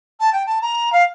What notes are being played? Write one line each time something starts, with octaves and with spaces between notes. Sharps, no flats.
A5
G5
A5
A#5
F5